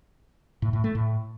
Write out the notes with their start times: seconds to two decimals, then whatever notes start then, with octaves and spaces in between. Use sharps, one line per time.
0.62 A2
0.73 A2
0.84 A3
0.95 A2